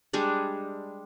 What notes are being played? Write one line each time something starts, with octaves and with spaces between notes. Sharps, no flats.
G3 G#3 D4 G#4